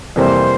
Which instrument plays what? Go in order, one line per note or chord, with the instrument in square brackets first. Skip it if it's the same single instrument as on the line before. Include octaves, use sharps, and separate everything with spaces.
[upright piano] F2 C3 E3 G3 A#3 [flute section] C5